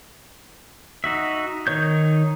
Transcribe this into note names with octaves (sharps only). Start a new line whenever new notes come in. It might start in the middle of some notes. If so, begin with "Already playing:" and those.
D#4 F#4 E5
D#3 D#4 C#5 G6